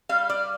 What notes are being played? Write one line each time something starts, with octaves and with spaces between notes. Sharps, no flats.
G3 F5
D5